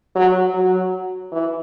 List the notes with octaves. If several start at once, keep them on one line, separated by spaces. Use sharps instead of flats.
F#3
F#3
E3